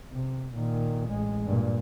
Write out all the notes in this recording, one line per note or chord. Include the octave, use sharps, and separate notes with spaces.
C3
A#2 D#3
A1 G#3
G2 A#2